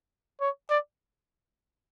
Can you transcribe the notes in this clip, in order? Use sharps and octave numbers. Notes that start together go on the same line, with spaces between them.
C#5
D5